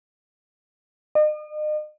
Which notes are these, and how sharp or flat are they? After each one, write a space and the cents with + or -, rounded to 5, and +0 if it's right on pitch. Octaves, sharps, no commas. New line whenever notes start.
D#5 -40